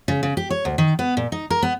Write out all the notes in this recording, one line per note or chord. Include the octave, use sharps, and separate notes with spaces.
C#3
C#3
G4
C#5
D2
D#3
B3
A#2
D#4
A#4
B3